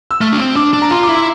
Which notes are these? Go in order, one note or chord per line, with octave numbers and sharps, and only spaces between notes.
E6
A3 F6
D4
C4
D4 D6
D4
A#5
F4 C6
D6
E4
C6